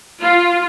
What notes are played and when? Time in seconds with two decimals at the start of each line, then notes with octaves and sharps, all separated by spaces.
0.23 F4